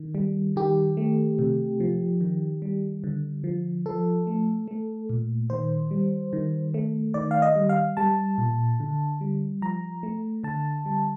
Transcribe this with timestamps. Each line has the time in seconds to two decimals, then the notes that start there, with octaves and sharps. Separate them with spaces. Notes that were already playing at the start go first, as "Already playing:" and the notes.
Already playing: D#3
0.15 G3
0.56 D#3 G4
0.97 A3
1.39 C3
1.80 F3
2.21 D#3
2.62 G3
3.04 D3
3.44 F3
3.86 F3 A4
4.27 A3
4.68 A3
5.09 A#2
5.50 D#3 C5
5.91 G3
6.33 D#3
6.74 A3
7.14 D#3 D5
7.31 F5
7.42 D#5
7.55 G3
7.69 F5
7.97 G3 A5
8.38 A#2
8.80 D3
9.21 G3
9.62 F3 A#5
10.03 A3
10.44 D3 A5
10.86 G3